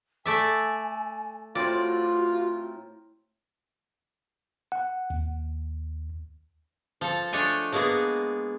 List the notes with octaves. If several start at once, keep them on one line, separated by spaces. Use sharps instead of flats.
A3 D5 E5 G#5
A2 C4 F4 F#4 A#4 D5
F#5
D#2
F3 A4
A3 D4 C#5 D#5 G#5
F#3 G#3 A#3 B3 G#4